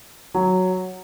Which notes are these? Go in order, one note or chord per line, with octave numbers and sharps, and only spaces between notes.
F#3